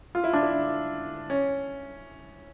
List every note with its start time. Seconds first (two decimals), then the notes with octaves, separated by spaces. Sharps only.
0.15 F4
0.24 E4
0.33 D4
0.43 E4
1.30 C#4